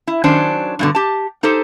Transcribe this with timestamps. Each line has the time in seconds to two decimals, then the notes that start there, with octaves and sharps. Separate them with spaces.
0.07 E4
0.24 D#3 F#3 C#4 D4 C5
0.79 G2 B2 D3
0.95 G4 A5
1.43 D#4 G4 A4 C5